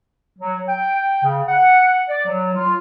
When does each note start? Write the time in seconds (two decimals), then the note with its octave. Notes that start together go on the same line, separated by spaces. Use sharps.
0.39 F#3
0.68 G5
1.24 C#3
1.48 F#5
2.09 D5
2.26 F#3
2.55 F4